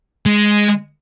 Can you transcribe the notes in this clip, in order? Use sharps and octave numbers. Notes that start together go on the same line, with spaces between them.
G#3